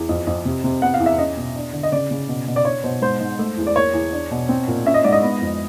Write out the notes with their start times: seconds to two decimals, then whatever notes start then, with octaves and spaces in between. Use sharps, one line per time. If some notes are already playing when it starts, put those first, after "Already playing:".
Already playing: E2
0.09 F2
0.27 F2
0.45 C3
0.64 C3
0.82 B3 F#5
0.94 F5
1.00 E2
1.06 E5
1.18 C#4 D#5
1.37 B2
1.56 D4
1.73 D3
1.83 D#5
1.92 C#3 D5
2.11 C#3
2.28 B2
2.48 B2
2.56 D5
2.65 D4 C#5
2.84 B2 C5
3.02 G#2 C5
3.20 G#2
3.39 A3
3.57 E2
3.67 D5
3.76 A#3 C#5
3.93 E2
4.12 D4
4.31 B2
4.49 C4
4.67 A#2
4.86 C#4 E5
4.94 D#5
5.04 G#2 D5
5.13 D#5
5.22 B3
5.42 F2